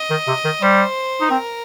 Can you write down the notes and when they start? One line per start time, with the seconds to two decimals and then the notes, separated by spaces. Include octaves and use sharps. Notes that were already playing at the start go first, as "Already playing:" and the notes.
Already playing: D#5
0.10 D#3
0.28 C3
0.44 D#3
0.62 G3 C5
1.21 D#4
1.30 C4 A#4